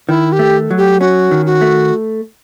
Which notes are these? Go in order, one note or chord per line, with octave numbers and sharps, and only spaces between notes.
D#3 E4
G4
A3
F#3
G4
C#4 F#4
D#3
F#4
A3